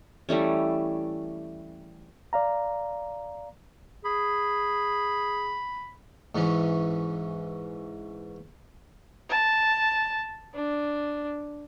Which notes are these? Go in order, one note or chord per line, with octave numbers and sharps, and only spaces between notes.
E3 G3 A3 C#4
D5 F5 A#5
G#4 B5
G#2 E3 C#4
A5
D4